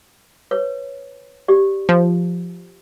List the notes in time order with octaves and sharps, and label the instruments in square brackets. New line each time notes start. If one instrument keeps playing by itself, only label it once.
[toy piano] B4 C#5
G4 D5
[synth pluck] F3